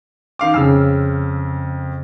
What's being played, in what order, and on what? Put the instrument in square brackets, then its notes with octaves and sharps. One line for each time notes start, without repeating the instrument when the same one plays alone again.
[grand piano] D#3 F5 D6
[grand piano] F2 [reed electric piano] C#3 E6 F6